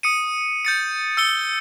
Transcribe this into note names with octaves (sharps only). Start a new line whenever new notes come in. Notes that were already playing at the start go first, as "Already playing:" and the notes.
D#6 C#7 D#7
G6 A6 C#7
E6 C#7 G7